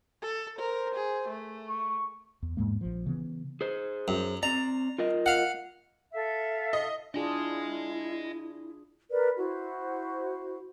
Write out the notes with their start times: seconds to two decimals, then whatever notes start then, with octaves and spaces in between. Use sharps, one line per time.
0.22 A4
0.59 A#4 C5
0.95 G#4
1.29 A3
1.69 C#6
2.42 E2
2.57 E2 G#2 G#3 A#3
2.81 A#1 F3
3.06 C#3 E3 B3
3.61 G#4 C5
4.08 F#2
4.43 C4 D5 A#5
4.98 F4 A#4 D#5
5.26 F5 F#5
6.13 A4 E5 F5
6.73 D#5
7.14 D4 E4 F4 G#4 D#5 G#5
9.10 A#4 B4 D5
9.37 E4 F#4 C5